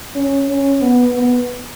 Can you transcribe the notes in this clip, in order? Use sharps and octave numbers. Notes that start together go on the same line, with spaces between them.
C#4
C#4
B3
B3